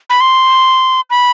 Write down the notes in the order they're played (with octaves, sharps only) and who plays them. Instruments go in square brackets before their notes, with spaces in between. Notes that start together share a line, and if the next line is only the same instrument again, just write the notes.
[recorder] B5
C6
B5